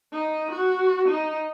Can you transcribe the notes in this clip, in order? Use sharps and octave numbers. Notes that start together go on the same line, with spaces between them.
D#4
F#4
D#4